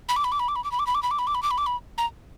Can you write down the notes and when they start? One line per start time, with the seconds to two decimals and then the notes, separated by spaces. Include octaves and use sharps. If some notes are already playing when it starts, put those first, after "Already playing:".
0.09 B5
0.16 D6
0.24 B5
0.32 D6
0.40 B5
0.48 D6
0.56 B5
0.64 D6
0.72 B5
0.79 D6
0.87 B5
0.95 D6
1.03 B5
1.11 D6
1.19 B5
1.27 D6
1.35 B5
1.43 D6
1.51 B5
1.58 D6
1.66 B5
1.98 A#5